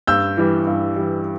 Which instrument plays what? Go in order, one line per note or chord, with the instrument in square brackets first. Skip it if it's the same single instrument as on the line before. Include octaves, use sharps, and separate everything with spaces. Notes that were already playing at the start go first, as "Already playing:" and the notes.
[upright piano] G2 E6 G6
E3 G3
G2
E3 G3